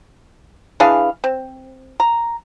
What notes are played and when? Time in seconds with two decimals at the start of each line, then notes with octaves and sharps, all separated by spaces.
0.80 E3 D4 G#4 F5
1.24 C4
2.00 A#5